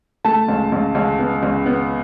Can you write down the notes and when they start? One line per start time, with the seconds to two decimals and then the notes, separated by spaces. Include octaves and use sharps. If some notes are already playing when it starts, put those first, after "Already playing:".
0.24 A3 A5
0.48 C#2
0.72 C#2
0.95 C#2
1.19 B3
1.43 C#2
1.66 B3